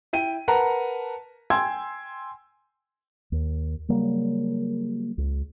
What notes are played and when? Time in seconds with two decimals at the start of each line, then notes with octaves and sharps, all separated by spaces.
0.13 E4 G5 D#7
0.48 A#4 B4 F#5 A5 A#5
1.50 G5 G#5 C6 E6 G#6
3.32 D#2
3.88 C#3 F#3 G3 A#3
5.18 C#2